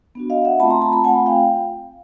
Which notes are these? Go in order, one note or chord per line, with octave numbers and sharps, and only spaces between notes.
B3 D4 F#4
D#5 F5
E5 F#5
A3 C4 F4 A5 B5
A#5 C6
A5 B5
A5 B5
A3 C4 F4 F#5 G#5
F5 G5